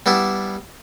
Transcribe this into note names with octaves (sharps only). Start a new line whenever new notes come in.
G3 B3 D4 E4